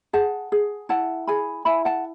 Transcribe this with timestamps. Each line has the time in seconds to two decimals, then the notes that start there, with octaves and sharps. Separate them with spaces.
0.13 G#4 F#5 A5
0.52 G#4
0.89 E4 F#5 A5
1.27 G#4 G#5 B5
1.65 E4 G#5 B5
1.85 F#5 A5